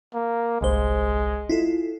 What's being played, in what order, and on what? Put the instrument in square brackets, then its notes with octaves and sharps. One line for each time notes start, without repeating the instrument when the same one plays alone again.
[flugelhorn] A#3
[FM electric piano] G1 C2 C5 [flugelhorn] G#3
[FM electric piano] E4 F4 A4